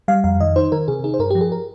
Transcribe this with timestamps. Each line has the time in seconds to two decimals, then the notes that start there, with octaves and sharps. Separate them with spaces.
0.08 G3 F5
0.24 F2 F5
0.40 D#3 D#5
0.56 D#4 C5
0.72 D#3 A#4
0.88 C3 G#4
1.04 D#4 G#4
1.14 C5
1.19 G2 A#4
1.30 G4
1.35 F3
1.41 G#4
1.52 A#4